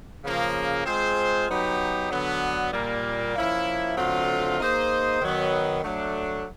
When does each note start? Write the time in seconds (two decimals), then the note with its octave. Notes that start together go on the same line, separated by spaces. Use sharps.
0.24 C#3 F3 A#3
0.85 G#3 C4 F4 G#4 C5
1.48 F#3 B3 D#4 G4
2.10 D3 F#3 B3
2.73 A#2 G3 A#3
3.35 F3 A#3 C#4 E4
3.97 D3 F#3 A3 C4 F4
4.59 A#3 D#4 G#4 C5 D#5
5.20 D#3 F#3 B3
5.83 F#3 A3 D4